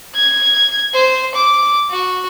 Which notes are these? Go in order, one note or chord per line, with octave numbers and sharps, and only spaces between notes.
G#6
C5
D6
F#4